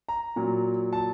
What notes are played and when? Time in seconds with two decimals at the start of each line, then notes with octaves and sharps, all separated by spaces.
0.09 A#5
0.36 A#2 F#3
0.93 A5